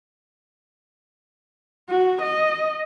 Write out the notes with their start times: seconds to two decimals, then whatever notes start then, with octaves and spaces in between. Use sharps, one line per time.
1.90 F#4
2.21 D#5